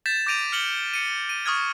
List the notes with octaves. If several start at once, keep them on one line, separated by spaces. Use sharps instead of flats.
G6 A6 B6 E7
D6 G6 A#6 D7 D#7 F7
F6 C#7 F#7 G7
C#7 D#7
D#7
C#6 D#6 F6 G#6